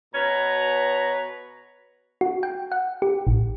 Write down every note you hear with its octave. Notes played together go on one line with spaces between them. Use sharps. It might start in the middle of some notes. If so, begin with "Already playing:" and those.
B2 B4 C#5 A#5
F#4
G5
F#5
G4
A1